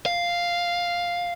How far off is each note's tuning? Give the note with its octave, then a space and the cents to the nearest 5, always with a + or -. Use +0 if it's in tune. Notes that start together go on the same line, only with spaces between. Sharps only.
F5 +0